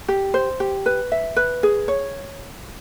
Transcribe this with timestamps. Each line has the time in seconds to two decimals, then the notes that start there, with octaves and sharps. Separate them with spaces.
0.08 G4
0.34 C5
0.60 G4
0.86 B4
1.12 E5
1.36 B4
1.63 G#4
1.88 C#5